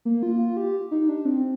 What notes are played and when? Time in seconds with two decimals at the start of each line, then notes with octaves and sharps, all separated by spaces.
0.05 A#3
0.23 F4
0.39 F4
0.57 G4
0.91 D#4
1.09 D4
1.25 C4